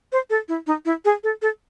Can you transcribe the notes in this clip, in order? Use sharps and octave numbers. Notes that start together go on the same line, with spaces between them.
C5
A4
E4
D#4
E4
G#4
A4
A4